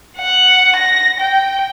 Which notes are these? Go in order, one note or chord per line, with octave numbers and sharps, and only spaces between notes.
F#5
A#6
G5